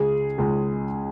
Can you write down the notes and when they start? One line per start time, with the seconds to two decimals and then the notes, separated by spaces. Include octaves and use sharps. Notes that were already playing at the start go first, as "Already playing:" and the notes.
Already playing: C#2 C#3 G#3 G#4
0.38 C#2 C#3 G#3